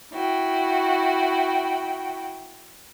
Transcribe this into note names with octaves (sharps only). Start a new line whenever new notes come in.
E4 F#4 G5